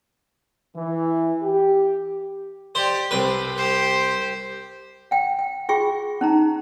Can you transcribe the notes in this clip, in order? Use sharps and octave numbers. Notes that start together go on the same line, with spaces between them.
E3
G4
G4 C5 D5
C2 C4 B4
G4 C5
F#5 G5
G5
F4 F#4 G#4 G5 C#6
C#4 D#4 A#5